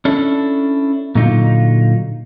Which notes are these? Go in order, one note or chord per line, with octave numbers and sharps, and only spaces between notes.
C#4 D4 E4 A4
A#2 D3 F#3 D#4 F4